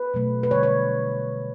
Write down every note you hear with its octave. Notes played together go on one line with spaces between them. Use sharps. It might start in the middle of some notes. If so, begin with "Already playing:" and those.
Already playing: B4
B2 F#3 A3
B4
D3 G3 C#5
C#5